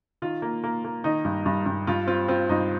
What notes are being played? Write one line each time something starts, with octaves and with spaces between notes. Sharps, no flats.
D#3 F4
A#3
A#3
A#3
D#3 D#4
G2
G2
G2
G2 F4
C4 F4
C4 F4
G2 D#4